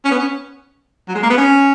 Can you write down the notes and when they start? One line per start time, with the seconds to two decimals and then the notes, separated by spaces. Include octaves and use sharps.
0.05 C#4
0.11 B3
0.19 C#4
1.08 F#3
1.15 G#3
1.23 A#3
1.30 B3
1.38 C#4